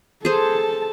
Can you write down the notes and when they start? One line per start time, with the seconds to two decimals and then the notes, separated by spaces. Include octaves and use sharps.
0.25 G#4 A4 C5 A5